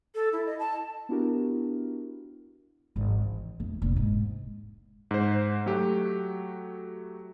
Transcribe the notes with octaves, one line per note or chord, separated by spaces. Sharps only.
A4
E4
D#5
A5
B3 D4 E4 F#4 G4 A#4
G#1 F3
E3
F2 A3
F1 A#2
G#2
G#2 C5
F#3 A3 F#4 G4